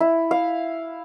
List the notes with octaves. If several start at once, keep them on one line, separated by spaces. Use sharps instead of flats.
E4
F5